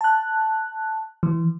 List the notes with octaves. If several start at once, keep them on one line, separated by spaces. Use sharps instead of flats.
A5 F#6
E3